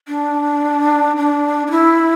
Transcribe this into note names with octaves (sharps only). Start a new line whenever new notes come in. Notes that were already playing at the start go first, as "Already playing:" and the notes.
D4
D4
D4
E4